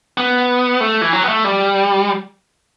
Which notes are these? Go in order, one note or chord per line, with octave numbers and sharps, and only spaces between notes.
B3
A3
E3
F#3
B3
A3
G3